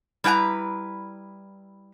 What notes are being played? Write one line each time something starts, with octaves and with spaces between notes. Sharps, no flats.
G3 E4 B4 G5 A#5